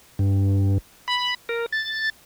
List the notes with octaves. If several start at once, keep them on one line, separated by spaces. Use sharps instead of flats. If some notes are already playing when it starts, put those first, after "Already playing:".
G2
B5
A#4
A6